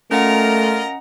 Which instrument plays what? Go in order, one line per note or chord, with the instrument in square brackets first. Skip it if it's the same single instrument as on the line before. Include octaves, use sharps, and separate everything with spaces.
[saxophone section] A#2 F4 A#4 [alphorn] A3 [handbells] C#4 F#5 [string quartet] D#5 A#5